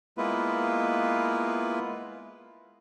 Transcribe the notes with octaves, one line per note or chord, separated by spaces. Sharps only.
G#3 A#3 B3 E4 F4 B4